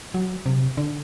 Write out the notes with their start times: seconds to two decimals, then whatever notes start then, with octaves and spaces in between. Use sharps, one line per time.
0.14 F#3
0.46 C3
0.77 D3